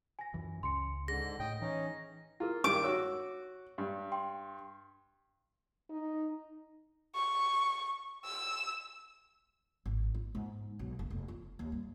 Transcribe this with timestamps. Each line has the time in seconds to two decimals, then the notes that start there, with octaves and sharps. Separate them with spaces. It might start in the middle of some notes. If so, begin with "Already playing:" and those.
0.19 G#5 A#6
0.34 F#2 E3
0.63 C#2 C#3 C6 C#7
1.08 G#2 D3 G#4 A#6
1.40 A2 D#5 G5
1.61 E3 C#4 D#4
2.40 E4 F4 G#4 A#4
2.64 G2 D#3 D6
2.84 F#4 C#5 E6
3.78 G2
4.12 G5 C6
5.90 D#4
7.15 C#6
8.25 E6
9.86 G#1
10.14 F4
10.35 G#2
10.79 B1
10.99 F#1
11.10 F1
11.28 F4
11.59 D#2
11.72 G2